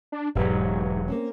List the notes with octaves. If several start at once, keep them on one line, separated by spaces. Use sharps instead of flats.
D4
E1 G#2 F#3 D4 G4 B4
A#3 C4 C#4